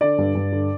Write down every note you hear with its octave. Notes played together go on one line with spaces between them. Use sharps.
D3 D5
G2
G2
D3